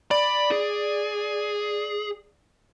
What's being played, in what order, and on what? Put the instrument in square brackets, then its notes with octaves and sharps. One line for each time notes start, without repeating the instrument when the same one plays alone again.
[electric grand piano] D5 [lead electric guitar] B5
[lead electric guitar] G#4